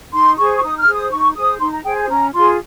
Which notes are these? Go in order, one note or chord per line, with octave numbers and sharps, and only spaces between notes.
D#4 C6
G#4 C5 C#6
C#6
D#4 D#6
F6
G#4 C5
D#6
D#4 C#6
G#4 C5 D#6
D#4 C6
A#5
G#4 C5 G5
G#5
C#4 A#5
F4 G#4 C6